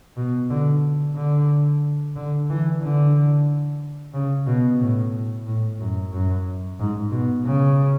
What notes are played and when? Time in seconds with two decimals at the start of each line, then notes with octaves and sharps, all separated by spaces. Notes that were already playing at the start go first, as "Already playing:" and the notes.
0.17 B2
0.50 D3
1.16 D3
2.16 D3
2.49 E3
2.82 D3
4.14 C#3
4.47 B2
4.81 A2
5.46 A2
5.80 F#2
6.12 F#2
6.79 G#2
7.11 B2
7.46 C#3